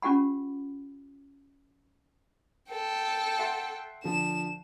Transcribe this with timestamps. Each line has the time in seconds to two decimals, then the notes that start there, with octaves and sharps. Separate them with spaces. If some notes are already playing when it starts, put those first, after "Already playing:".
0.02 C#4 F4 G4 F#5 B5
2.71 A4 G5
3.39 E5 F#5 C6
4.04 D3 F3 E7